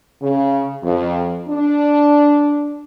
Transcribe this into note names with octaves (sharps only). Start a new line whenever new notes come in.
C#3
F2
D4